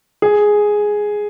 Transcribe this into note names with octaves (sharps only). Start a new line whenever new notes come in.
G#4